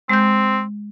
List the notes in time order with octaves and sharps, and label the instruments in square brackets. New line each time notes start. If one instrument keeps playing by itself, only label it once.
[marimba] G#3 G6 [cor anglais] C4